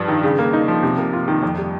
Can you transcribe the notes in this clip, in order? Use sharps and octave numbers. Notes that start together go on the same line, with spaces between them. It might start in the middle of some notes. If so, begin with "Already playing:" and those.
Already playing: G2 F3
D#3
C#3
A#3
D#4
F3
C3
A#3
F4
D#3
F2
G3